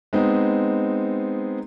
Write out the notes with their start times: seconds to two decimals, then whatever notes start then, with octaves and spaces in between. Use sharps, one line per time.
0.13 G#3 B3 C4 D#4